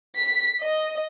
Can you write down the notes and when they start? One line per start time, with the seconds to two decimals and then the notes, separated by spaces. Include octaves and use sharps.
0.18 B6
0.62 D#5